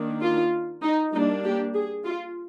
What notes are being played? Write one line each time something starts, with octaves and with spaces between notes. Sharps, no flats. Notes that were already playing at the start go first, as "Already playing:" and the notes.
Already playing: D#3 A#3 D4
F4
D#4
G3 A#3 D4 D#4
G4
G#4
F4